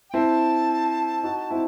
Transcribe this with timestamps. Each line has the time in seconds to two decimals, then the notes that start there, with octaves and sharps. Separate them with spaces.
0.10 G5
0.14 C4 E4 A5
1.23 D#4 F#4
1.51 C4 E4